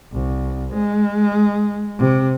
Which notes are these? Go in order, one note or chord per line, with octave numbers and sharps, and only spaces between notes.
C2
G#3
C3